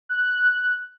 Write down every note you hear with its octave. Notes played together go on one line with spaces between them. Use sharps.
F#6